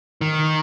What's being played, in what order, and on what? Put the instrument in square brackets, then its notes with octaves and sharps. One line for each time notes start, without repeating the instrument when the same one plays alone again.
[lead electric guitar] D#3